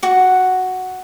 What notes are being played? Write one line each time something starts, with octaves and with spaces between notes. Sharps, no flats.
F#4 F#5